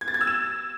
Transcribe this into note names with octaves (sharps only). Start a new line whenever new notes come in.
G#6
A6
G#6
E6
E7